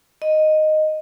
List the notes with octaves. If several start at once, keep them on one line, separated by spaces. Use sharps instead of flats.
D#5